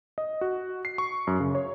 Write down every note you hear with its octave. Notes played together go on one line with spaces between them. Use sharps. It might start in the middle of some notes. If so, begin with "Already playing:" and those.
D#5
F#4
C7
C#6
F#2
C#3
C#5